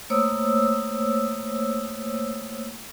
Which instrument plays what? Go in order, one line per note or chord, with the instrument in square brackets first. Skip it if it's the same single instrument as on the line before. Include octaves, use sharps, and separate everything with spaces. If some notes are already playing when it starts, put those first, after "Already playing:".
[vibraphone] A3 A#3 C5 C#5 D#6 E6